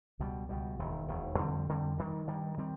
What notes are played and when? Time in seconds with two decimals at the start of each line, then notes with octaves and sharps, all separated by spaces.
0.19 C#2 B2 G3
0.49 C#2 B2 G3
0.79 E1 D#2 D#3
1.08 E1 D#2 D#3
1.38 F2 D3 G3 C4
1.68 F2 D3 G3 C4
1.98 G2 D#3 G3
2.27 G2 D#3 G3
2.58 D#3 G3 C4